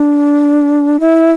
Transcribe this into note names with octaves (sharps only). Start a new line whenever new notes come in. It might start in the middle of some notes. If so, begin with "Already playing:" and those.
Already playing: D4
E4